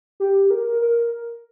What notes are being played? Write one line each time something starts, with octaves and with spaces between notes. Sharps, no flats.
G4
A#4
A#4